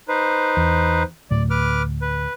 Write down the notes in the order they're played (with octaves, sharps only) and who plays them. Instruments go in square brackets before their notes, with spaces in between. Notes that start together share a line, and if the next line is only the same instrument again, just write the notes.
[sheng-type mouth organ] D#4 B4 C5
[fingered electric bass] E2
[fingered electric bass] D2 A2 A3 [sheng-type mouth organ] D5
[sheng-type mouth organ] B4 D6 F6
B4